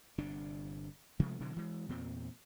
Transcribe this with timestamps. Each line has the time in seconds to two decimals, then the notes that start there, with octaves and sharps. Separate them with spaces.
0.18 G1 C3 D4
1.19 C3 F3 G#3 A3
1.40 B2 D3 E3 F#3
1.56 E3 G#3
1.89 E2 A#2 C4